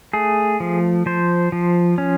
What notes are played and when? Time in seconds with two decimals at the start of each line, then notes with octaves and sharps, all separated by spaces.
0.13 A3 G#4
0.60 F3
1.06 F3 C5
1.52 F3
1.98 C#4